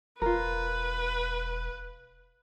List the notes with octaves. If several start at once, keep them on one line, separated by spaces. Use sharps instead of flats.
E1 F4 A#4 B4